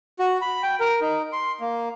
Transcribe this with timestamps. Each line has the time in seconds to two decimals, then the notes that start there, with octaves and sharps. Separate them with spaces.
0.19 F#4
0.42 B5
0.63 G5
0.80 A#4
1.01 D#4
1.33 C6
1.60 A#3